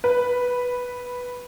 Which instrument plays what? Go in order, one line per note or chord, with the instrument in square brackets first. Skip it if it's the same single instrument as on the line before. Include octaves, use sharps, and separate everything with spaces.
[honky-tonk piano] B4